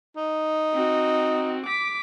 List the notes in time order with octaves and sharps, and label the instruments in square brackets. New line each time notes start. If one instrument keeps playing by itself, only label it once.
[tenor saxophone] D#4
[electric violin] C4 F#4
D6 B6